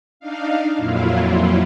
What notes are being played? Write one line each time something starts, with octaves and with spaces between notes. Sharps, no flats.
D4 D#4 F5
F2 A#2 F#3 E4 F4